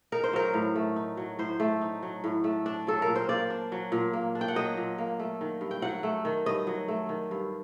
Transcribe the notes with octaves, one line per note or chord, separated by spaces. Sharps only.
D#4 A#4
C5
F#3 A#4
A2
A3
D#4
F#3
A2 C5
A3
D#4
F#3
A2
A3
D4
F#3 A4
A#4
A#2
C5
A#3 D5
D4
F#3
A#2
A#3
D4
G5
F#5
F#3 D#5
A#2
A#3
A3
D#3
G2
G5
F#3 F#5
A3
D#3
G2 D#5
F#3
A3
D#3
G2